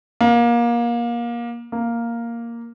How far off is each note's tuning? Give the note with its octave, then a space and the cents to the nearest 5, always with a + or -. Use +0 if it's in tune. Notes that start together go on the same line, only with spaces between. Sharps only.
A#3 +25
A#3 +0